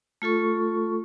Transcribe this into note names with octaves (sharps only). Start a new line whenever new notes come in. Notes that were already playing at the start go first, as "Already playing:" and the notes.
A3 F4 A4 C#6